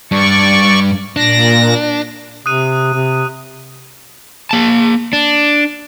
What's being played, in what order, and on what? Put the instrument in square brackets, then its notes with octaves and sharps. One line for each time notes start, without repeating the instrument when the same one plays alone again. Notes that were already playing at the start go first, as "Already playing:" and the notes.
[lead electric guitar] G2 [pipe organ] D5 C#6
[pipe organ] A#2 A#6 [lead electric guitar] D4
[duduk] C3 [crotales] D#6 F#6 D#7
[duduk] C3
[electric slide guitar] A#3 A5
D4